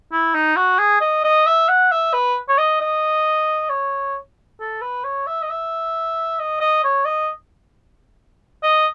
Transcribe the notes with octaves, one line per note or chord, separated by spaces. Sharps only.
E4
D#4
F#4
G#4
D#5
D#5
E5
F#5
E5
B4
C#5
D#5
D#5
C#5
A4
B4
C#5
E5
D#5
E5
D#5
D#5
C#5
D#5
D#5